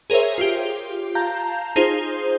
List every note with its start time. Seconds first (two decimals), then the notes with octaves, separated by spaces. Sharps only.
0.10 G#4 A#4 C5 C#5 E5
0.38 F4 G4
1.15 F5 A5 A#5 G6
1.76 D#4 F4 G#4 C5